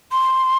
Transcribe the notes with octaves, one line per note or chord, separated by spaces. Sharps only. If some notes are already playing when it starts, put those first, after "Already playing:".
C6